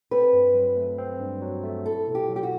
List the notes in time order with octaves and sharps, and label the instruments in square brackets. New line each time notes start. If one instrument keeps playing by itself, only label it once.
[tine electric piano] C4 [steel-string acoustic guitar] B4
[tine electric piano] G2
F#3
A3
C4
G2
F#3
A3
[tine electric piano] E4 [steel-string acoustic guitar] A4
[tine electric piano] B2
[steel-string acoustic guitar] G4
[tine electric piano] F#3
[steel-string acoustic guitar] G4
F#4